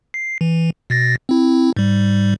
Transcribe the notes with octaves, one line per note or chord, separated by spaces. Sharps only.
C7
E3
B2 A6 A#6
C4 E4
G#2 G3